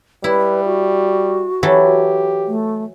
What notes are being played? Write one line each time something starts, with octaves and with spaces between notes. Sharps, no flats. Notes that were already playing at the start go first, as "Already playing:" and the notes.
G3 E4 B4
F#4
E3 F#3 G4 A4
A3